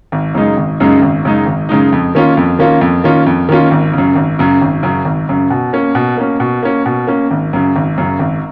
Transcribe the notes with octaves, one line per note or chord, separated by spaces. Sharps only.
G#1
F#2 C#3 G#3 D#4
G#1
F#2 C#3 G#3 D#4
G#1
F#2 C#3 G#3 D#4
G#1
F#2 C#3 G#3 D#4
F2
D#3 A#3 C#4 F4
F2
D#3 A#3 C#4 F4
F2
D#3 A#3 C#4 F4
F2
D#3 A#3 C#4 F4
G#1
F#2 C#3
G#1
F#2 C#3
G#1
F#2 C#3
G#1
F#2 C#3
B2
A#3 C#4
B2
A#3 C#4
B2
A#3 C#4
B2
A#3 C#4
G#1
F#2 C#3
G#1
F#2 C#3
G#1